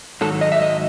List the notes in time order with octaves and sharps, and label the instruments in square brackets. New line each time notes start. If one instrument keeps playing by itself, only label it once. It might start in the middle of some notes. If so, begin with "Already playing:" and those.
[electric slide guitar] G#2 D#3 F#3 A4
D#5
E5
D#5